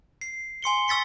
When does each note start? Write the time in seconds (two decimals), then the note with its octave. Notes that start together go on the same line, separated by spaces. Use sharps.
0.21 C7
0.63 G#5 C6 C#7 G7
0.88 C#6 E6 A6 B6 C#7